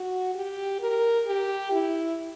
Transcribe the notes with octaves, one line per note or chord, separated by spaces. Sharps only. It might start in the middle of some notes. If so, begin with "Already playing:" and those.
Already playing: F#4
G4
A#4
G4
E4